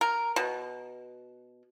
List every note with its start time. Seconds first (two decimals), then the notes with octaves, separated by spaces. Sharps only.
0.01 A#4
0.36 B2